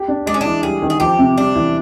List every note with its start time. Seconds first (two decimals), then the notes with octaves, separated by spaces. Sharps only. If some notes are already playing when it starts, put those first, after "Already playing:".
Already playing: G4
0.08 D4
0.26 G#3 D4
0.34 C#4
0.41 E3 D4
0.63 G3 G#4
0.82 D#3
0.90 G#4
1.00 F3 G4
1.19 C3
1.37 G3 D4
1.55 E3